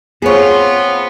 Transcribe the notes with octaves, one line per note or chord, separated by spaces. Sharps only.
B3 C4 F4 G#4 C#5